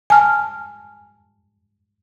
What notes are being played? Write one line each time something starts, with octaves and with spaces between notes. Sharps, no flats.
G#5 A5 F6